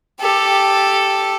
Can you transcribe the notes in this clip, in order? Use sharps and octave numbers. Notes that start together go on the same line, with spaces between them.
G4 A4